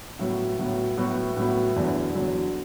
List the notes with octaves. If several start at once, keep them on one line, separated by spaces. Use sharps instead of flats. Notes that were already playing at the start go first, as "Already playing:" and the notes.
A2 F#3 B3 F#4
A2 F#3 B3 F#4
A2 F#3 B3 F#4
A2 F#3 B3 F#4
E2 D3 F#3
E2 D3 F#3